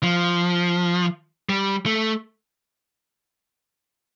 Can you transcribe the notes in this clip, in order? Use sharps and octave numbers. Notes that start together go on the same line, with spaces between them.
F3
G3
A3